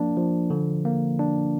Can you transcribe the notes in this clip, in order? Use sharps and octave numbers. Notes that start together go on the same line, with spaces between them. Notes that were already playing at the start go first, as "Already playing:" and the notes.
Already playing: F3 A#3 D4
F3
D3
A#3
D4